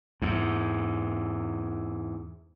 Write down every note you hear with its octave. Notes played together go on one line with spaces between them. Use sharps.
E2 G#2